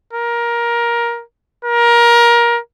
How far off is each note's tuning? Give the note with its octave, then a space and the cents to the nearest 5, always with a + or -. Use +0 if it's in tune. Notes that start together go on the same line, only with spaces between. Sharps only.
A#4 +15
A#4 +20